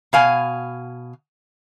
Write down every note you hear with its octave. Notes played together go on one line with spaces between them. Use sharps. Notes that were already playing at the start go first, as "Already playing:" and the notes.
B2 F5 G#5